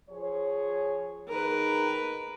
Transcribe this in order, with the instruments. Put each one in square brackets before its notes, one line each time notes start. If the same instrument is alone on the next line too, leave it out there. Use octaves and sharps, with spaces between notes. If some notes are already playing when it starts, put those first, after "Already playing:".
[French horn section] F3 G#4 C#5
[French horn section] D#3 D#4 G#4 [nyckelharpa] A#4 B4